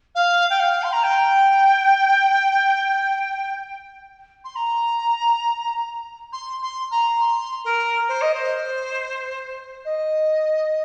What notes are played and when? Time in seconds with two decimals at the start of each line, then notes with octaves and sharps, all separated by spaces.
0.15 F5
0.49 G5
0.59 F5
0.82 C6
0.92 A#5
1.03 G5
4.44 C6
4.55 A#5
6.32 C6
6.62 C6
6.91 A#5
7.20 C6
7.64 A#4
8.08 C5
8.21 D#5
8.34 C5
9.84 D#5